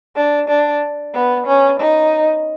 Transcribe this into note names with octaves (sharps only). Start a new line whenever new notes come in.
D4
D4
B3
C#4
D#4